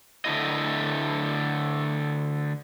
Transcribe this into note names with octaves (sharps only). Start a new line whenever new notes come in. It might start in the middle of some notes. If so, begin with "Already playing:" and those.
D3 A3 E4 D#5